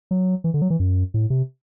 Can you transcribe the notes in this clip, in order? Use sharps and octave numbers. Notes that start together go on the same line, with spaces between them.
F#3
E3
D3
F#3
E3
F#2
A2
C3